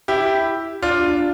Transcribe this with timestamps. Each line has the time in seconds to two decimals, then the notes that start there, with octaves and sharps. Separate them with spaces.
0.08 E4 G4
0.82 D4 F4